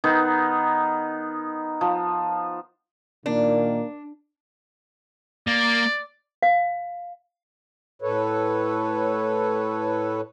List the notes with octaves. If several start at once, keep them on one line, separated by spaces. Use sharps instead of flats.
D#3 B3 D#4
F3
A#2 D#3 A#3 D4
A#3 D5
F5
A2 A4 B4 C#5